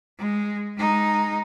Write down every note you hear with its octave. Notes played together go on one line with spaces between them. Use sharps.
G#3
G#3 D#4